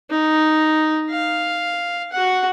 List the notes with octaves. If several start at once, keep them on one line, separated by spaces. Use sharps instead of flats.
D#4
F5
F#4 F#5